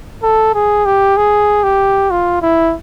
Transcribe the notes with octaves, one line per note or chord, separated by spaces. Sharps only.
A4
G#4
G4
G#4
G4
F4
E4